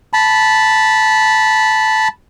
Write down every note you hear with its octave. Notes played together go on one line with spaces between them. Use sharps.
A5 B5